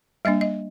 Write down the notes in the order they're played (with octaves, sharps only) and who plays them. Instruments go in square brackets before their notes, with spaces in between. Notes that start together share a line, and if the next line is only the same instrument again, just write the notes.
[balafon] G3 A#3 D4 D#5
D#5